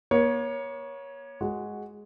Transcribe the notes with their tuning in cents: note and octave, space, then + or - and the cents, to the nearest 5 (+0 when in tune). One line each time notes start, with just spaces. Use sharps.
A#3 +40 C#5 +0
G#3 +0 F#4 +0